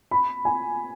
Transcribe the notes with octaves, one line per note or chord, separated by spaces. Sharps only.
B5
G#5